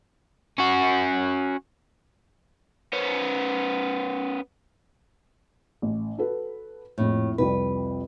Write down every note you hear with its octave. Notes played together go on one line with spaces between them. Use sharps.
C#4 F#4
B3 C#4
A1
F#4 A4 B4
A#1 F2 A2
C2 F2 G3 B4